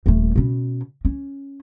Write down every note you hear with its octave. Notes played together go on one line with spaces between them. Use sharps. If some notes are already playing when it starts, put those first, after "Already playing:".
D#1 A3
B2 C#4
C#4